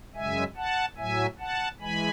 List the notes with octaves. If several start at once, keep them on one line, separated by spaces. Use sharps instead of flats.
F#2 C#3 G#3 E5 G#5
F#5 A5
A2 F#3 E5 G#5
F#5 A5
E3 G#3 G#5 B5